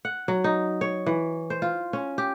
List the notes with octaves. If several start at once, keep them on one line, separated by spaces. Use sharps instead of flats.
F#5
F#3
D#4
C#5
E3
C5
F4
C#4
G4